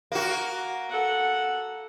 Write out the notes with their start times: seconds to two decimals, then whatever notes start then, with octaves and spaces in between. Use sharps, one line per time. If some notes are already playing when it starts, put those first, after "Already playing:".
0.12 A#3 F#4
0.89 A4 F#5